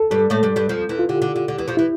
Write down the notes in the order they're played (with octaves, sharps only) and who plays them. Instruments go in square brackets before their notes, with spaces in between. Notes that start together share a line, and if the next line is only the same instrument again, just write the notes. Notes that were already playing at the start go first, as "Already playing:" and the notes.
Already playing: [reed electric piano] A4
[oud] G2 G3 [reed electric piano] A4
[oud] A2 A3
G2 G3
G2 G3
F2 F3
E2 E3
[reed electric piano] F4
[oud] D3 [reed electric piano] G4
[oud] D3
D3
D3
E2 E3
F2 F3
[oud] E3 [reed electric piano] E4